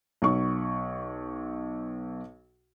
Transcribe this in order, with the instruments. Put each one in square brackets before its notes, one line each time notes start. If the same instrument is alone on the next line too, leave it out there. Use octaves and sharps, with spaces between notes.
[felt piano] B1 C#6